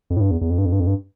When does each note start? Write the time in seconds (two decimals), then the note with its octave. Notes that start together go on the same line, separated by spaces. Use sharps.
0.10 F2
0.17 A2
0.21 G2
0.31 E2
0.41 E2
0.50 F2
0.58 G2
0.65 F2
0.72 G2
0.80 F2
0.87 G2